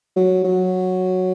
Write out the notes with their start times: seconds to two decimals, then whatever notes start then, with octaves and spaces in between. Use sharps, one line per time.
0.16 F#3
0.44 F#3